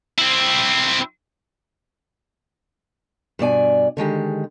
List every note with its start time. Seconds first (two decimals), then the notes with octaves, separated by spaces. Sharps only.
0.18 C4 E4
3.39 G2 B2 D5 G#5
3.97 D3 D#3 G#3 G4